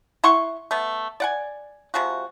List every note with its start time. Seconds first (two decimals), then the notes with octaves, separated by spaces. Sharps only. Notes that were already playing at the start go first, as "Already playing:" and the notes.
0.24 E4 F#5 C6 C#6
0.71 A3 B3
1.20 D5 F#5 G#5
1.94 C3 F3 G#3 F#4